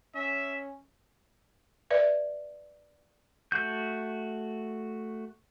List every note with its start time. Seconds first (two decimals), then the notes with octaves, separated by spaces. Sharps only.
0.15 C#4 E5
1.91 B4 D5 E5
3.52 A3 F#4 G6